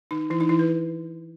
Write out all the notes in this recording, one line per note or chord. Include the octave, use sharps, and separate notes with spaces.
D#3 D#4
E3 E4
D#4
E3 E4
B4